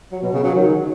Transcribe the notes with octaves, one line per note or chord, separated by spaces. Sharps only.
F#3
B2
C#3
F#3
D#3